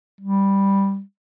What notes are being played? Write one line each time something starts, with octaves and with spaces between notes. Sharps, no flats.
G3